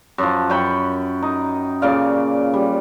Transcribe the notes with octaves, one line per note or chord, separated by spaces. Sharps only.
F#2 F3
F#2 G5 B5 C#6
D#4
A#2 C#3 D5 F5
G3